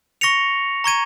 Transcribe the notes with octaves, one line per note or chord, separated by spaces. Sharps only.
C#6 A#6 C#7 F7
A#5 C#6 G#6 D#7